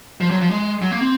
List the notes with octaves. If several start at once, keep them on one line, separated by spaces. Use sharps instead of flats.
F3
F#3
F3
G#3
F#3
A#3
C4